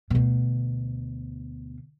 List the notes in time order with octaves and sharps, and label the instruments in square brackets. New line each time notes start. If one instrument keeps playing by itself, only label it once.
[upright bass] D2 B2